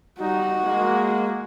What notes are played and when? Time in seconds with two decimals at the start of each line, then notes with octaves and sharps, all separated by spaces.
0.20 G3 D#4 F#4
0.64 G#3 A#3